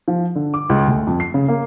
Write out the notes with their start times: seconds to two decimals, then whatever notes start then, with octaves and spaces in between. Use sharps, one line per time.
0.08 F3
0.35 D3
0.54 D6
0.69 C#2
0.88 D2
1.07 F2
1.20 C7
1.34 C#3
1.48 A#3